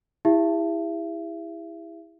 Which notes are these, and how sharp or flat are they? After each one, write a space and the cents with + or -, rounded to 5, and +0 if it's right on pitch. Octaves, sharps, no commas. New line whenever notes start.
E4 -5 G4 +40 E5 +35